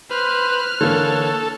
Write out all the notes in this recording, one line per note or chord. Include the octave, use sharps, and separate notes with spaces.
B4 C5 F6 F#6
D3 E3 A#3 A4 C#5